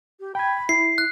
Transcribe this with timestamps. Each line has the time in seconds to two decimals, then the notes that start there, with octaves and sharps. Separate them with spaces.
0.20 G4
0.35 G5 B5 G#6
0.69 E4 C7
0.98 F#6